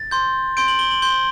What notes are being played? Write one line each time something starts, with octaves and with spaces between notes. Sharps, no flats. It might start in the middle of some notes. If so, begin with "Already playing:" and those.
Already playing: A6
C6 G6
C6 G6 D7
F#7
G7
F#7
C6 G6 G7